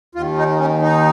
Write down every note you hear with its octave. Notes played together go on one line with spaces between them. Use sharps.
D#2 D#3 F4
D#4
C#4
D#4